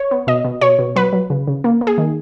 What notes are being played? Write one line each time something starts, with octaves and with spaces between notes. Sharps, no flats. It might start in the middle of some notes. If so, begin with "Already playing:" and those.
Already playing: C#5
B3
B2 D#5
B2
B2 C#5
B2
F#3 B4
F#3
C#3
C#3
A#3
A#3
G#4
D#3